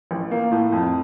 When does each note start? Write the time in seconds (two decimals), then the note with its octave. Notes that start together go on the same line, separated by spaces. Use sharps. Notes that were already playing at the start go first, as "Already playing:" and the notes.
0.11 A1
0.31 A#3
0.51 A2
0.72 F2